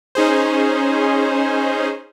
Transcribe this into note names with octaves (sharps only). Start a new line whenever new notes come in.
C#4 D#4 G#4 C5